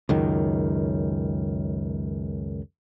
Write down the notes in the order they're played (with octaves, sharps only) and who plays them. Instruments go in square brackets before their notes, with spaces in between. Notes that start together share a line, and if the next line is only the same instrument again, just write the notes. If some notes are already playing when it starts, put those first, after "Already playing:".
[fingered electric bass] C#2 F#2 D#3